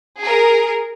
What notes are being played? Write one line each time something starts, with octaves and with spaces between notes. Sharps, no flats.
G#4 A#4